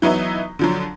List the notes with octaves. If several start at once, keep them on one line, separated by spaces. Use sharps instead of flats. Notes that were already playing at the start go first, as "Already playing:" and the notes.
E3 F#3 B3 D#4 E4
D3 F3 F#3